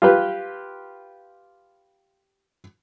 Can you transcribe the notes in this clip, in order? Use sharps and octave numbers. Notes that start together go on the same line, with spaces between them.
F4 G4 B4